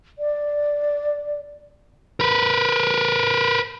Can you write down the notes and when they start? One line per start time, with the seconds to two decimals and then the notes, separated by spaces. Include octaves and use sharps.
0.19 D5
2.20 A#4 B4